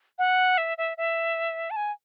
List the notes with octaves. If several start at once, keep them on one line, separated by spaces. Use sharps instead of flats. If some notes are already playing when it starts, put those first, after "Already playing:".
F#5
E5
E5
E5
A5
G#5